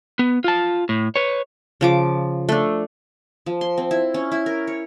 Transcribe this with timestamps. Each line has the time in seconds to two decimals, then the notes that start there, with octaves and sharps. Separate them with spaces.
0.19 B3
0.44 F4 A5
0.89 A2
1.16 B4 C#5
1.81 C#3 F3 D6
2.49 A3 D4
3.46 F3
3.61 C6
3.78 C4
3.91 E4
4.14 C#4
4.31 E4
4.46 A#4
4.67 C#5